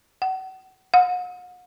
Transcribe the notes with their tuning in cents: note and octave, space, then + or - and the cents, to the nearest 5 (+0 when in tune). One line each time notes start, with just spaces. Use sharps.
F#5 +35
F#5 -40